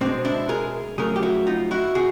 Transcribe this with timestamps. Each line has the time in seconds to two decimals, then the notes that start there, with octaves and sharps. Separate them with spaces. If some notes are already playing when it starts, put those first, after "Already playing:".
0.01 B2 G#3 C4 D4
0.25 D4 E4
0.49 G#4 A#4
0.98 F2 C#3 F#3 A3 G#4 A#4
1.16 G4
1.22 E4 F#4
1.47 D#4 F4
1.71 E4 F#4
1.95 C3 F#4 G#4